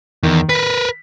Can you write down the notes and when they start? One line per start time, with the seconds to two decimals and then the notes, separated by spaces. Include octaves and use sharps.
0.23 E2 D#3
0.49 A#4 B4 B6